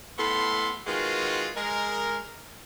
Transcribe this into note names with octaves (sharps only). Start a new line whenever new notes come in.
A2 B3 A4 B5 C6
D#3 G#3 B3 F4 F#4 G#4
G#3 A#4